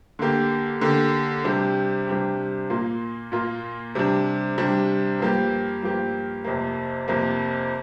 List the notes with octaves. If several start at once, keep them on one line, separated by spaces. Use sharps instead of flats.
D3 A#3 G4
D3 A#3 G4
C3 G3 D4 G4
C3 G3 D4 G4
A#2 A#3 F4
A#2 A#3 F4
C3 G3 D4
C3 G3 D4
G2 F3 A#3 G4
G2 F3 A#3 G4
F2 C3 A#3
F2 C3 A#3